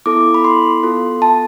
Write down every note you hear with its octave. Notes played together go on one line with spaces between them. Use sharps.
B3 E4 A4 D6
B5
C6
B3 F4 A4
A5